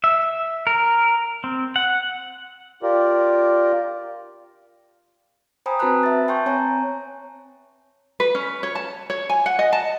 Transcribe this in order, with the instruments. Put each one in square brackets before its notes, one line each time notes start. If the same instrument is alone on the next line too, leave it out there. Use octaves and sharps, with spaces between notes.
[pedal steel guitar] E5
A#4
C4
F#5
[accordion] F4 G4 A#4 D5
[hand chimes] C5 G5 G#5 A#5 B5 D#6
C4 F#4 B4 A5 B5 F#6
E5 A6
G5 A5 C6 C#6 G6
C4 C#5 G#5 A#5
[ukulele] B4
C#4
C#5
A5
C#5
G#5
F#5
D#5
A5